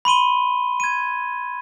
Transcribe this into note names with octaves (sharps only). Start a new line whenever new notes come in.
B5 C6 D#7 G7
G#6 D#7